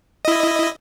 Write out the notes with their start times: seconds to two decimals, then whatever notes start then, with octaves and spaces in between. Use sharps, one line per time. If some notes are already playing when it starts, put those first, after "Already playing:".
0.25 E4 D#5